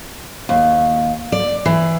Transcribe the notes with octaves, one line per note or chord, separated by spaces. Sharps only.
D#2
D5
E3